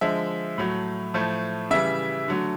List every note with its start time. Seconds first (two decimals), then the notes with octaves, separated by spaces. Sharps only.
0.01 D3 F3 G#3 E5
0.58 A2 F#3 A3
1.14 A2 F3 A3
1.71 C#3 E3 G3 E5
2.28 D3 F#3 A3